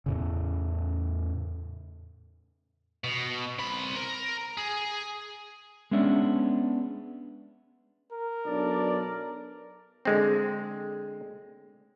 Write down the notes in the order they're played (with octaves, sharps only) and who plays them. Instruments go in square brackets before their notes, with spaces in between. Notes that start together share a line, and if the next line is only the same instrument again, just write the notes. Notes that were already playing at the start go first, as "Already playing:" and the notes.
[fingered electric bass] E2 A2 C#3
[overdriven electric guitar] B2
C4 B5
A#4
G#4
[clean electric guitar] G#3 B3 C#4 D4 E5
[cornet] A#4
[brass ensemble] B1 D4 D5
[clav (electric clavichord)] D3 G#3 C4